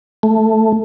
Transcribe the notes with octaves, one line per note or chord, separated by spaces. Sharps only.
A3